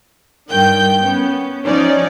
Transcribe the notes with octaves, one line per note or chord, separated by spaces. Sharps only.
G2 D#3 G5 G6
B3 C#4
F3 C#4 D#4 C#5 D5